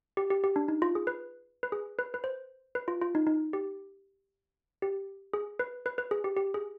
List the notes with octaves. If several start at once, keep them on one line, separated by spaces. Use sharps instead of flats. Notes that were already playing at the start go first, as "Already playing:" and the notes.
G4
G4
G4
D4
D#4
F4
G#4
B4
B4
G#4
B4
B4
C5
B4
F4
F4
D#4
D#4
G4
G4
G#4
B4
B4
B4
G#4
G4
G4
G#4